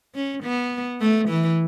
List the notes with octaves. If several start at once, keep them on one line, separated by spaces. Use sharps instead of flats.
C#4
B3
A3
E3